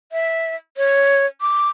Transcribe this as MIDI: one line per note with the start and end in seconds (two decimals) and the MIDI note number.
0.12 0.56 76
0.77 1.26 73
1.41 1.69 86